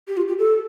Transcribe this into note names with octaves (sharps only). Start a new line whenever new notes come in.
G4
F4
G4
A4